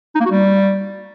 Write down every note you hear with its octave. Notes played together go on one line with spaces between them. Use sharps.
D#4
A#3
F#4
G3